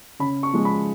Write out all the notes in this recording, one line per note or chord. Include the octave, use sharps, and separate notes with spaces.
C#3 B5
C#6
F3 G#3
B5